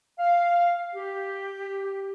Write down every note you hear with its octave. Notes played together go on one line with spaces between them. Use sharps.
F5
G4